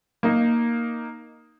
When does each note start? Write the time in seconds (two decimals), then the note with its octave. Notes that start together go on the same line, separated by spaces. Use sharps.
0.23 A#3 D#4